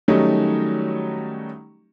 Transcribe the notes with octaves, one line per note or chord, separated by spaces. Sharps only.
D#3 F#3 G3 A3 C#4 D#4